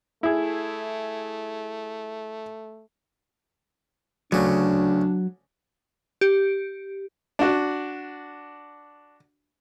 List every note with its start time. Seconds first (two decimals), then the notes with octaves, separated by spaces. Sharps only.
0.23 A3 E4 G#4
4.32 D2 C#3 F#3 D4
6.21 G4
7.39 D4 F#4